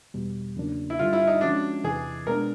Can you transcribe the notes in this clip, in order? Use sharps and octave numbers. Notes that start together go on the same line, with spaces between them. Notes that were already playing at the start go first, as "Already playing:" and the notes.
E2 B2 G3
E2 C#3 F#3 A#3 D4
E4
G2 D3 G3 F4
E4
D#4
F3 G#3 C#4 D4 F#4
E2 C3 E3 G#4
B2 G#3 B3 D4 A#4